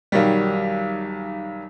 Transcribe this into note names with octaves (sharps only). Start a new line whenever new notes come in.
B1 D#3 F#3 G3